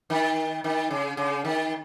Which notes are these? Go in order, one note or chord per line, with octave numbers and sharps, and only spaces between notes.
D#3
D#3
C#3
C#3
D#3